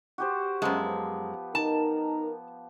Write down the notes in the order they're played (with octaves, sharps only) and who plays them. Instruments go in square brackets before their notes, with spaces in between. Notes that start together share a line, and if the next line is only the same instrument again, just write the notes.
[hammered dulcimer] F#4 G4 C5
[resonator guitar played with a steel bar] F#2 G#3 [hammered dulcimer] F3 B3
[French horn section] D#4 A#4 [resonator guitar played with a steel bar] A5